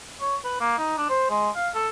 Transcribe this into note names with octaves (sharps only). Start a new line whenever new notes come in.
C#5
B4
A#3
D#4
D4
C5
G#3
F5
A4